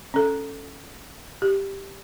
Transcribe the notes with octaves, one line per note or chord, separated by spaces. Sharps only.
C#4 A4
G4